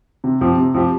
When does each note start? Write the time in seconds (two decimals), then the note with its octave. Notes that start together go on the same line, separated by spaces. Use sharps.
0.24 C3
0.41 F3 C4 G4
0.58 C3
0.74 F3 C4 G4